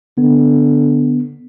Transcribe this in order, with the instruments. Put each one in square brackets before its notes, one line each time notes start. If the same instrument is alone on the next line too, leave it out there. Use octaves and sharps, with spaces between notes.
[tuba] D3 [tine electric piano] B3